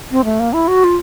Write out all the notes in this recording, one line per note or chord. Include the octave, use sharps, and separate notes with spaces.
C4
A3
A#3
E4
F#4
F4